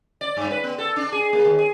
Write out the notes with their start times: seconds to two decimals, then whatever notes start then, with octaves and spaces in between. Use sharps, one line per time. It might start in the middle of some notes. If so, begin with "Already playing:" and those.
0.21 D5
0.37 G2
0.51 B4
0.64 B3
0.78 A4
0.96 D4
1.12 G#4
1.33 A#3
1.45 D#2
1.59 G#4